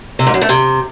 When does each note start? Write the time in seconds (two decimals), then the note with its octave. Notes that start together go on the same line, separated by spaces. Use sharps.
0.19 C3
0.26 G#2
0.34 F#2
0.41 A3
0.49 C3